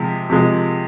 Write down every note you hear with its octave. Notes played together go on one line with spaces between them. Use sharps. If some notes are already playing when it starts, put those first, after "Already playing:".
Already playing: C3 F3 G#3
C3 F3 G#3